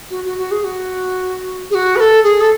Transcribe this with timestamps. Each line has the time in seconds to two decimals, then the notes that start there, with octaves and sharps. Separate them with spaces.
0.11 F#4
0.24 F#4
0.38 F#4
0.51 G#4
0.64 F#4
1.70 G#4
1.75 F#4
1.96 B4
2.00 A4
2.24 G#4
2.41 A4